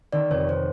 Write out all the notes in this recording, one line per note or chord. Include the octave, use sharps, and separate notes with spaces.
D#3 D5
F1 C#5
C5